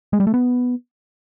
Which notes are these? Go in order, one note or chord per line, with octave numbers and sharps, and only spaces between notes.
G#3
G3
A3
B3